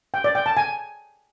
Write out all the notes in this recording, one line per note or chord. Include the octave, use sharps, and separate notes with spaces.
G5
D5
G5
A5
G#5